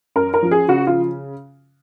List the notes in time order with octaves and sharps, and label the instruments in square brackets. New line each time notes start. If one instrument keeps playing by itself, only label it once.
[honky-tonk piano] F#2 A#4
A#4
F3
G#4
C#3 F#4
F4